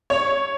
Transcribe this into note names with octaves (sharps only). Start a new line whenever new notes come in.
C#5